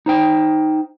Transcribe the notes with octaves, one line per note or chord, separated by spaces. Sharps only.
D#4 C5 G5